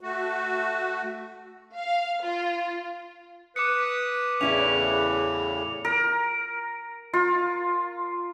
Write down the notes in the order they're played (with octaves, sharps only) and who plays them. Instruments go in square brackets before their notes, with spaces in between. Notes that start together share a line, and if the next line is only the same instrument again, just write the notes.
[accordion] A3 F#4
[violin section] F5
F4
[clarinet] B4 [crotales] D6 C#7 [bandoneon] D#6
[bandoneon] E2 A2 C#3 [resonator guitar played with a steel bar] C#4 E4 D5 [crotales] F7
[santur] A#4
F4